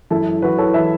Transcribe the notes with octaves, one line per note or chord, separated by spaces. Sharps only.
F#2 E3 E4 A4
F#2 E3 F#4 B4
A4 C#5
E3 E5 A5